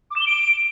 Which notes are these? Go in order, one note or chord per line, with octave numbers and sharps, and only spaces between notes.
D6
E7
G7
D7